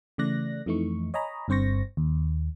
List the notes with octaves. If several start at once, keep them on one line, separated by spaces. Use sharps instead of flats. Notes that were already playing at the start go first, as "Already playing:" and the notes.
C#3 E3 A3 D5 F#6 A#6
F2 E3 A3 D#4 C#6
C#5 D#5 G#5 A#5 B5
G1 G2 C4 C5 C#6 A#6
D#2